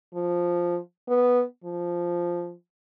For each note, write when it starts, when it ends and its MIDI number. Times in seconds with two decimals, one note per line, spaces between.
0.14 0.78 53
1.09 1.43 59
1.64 2.54 53